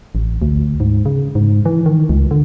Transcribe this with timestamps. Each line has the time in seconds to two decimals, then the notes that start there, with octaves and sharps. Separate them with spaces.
0.15 A1
0.42 D2
0.80 G#2
1.06 C#3
1.35 G#2
1.65 E3
1.86 D#3
2.09 C#2
2.31 D3